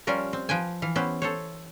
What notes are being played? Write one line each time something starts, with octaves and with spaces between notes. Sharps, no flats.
F3 G3 C#4 F4 A#4
C4
F3 B4 G5 G#5
E3 F5
B3 C#4 E4 G4 C5
A4 C5 C#5